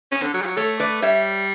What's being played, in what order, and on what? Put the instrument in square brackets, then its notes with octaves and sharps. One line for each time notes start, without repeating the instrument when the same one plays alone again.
[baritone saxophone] C#4
D3
F#3
G3
F#3
[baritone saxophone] A3 [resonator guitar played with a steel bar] A4 C#5
[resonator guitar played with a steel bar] B4 D5
[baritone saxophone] G3 [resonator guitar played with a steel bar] C#5 E5